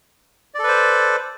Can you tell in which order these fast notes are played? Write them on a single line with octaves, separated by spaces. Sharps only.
D5 A4 B4 C5